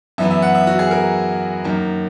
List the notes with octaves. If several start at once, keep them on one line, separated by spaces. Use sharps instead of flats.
F#2 E3 B3 E5
E5
F#5
E5
F#4
G#4
A#4
F#2 D#3 A#3